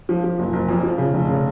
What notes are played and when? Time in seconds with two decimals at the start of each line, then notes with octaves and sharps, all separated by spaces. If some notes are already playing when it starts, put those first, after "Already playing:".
0.09 F3
0.24 F3
0.39 F#1
0.53 F#1
0.68 F2
0.83 F3
0.98 C#3
1.14 F1
1.29 C#3